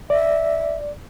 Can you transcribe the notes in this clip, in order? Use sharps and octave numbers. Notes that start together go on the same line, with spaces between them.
D5 E5